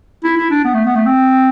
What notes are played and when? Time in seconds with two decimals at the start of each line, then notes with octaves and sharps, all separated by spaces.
0.24 E4
0.37 E4
0.51 D4
0.64 B3
0.74 A3
0.85 B3
0.95 A3
1.06 C4